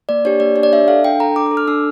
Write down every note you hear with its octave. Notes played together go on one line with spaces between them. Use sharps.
A#3 D5
D4 G4 C#5
A#3 D5
D4 G4 C#5
D5
D4 E5
A4 F5
D4 G5
A4 A#5
D4 D6
A4 D6
F6
D4 E6